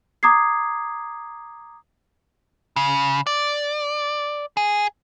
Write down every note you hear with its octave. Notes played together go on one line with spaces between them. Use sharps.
A#5 D6 D#6 G#6 C7
C#3
D5
G#4